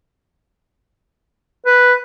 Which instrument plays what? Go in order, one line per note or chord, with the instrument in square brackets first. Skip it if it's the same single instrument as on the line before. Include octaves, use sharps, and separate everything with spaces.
[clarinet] B4